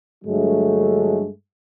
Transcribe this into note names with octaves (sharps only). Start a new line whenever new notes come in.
G2 D3 F#3 G#3 A3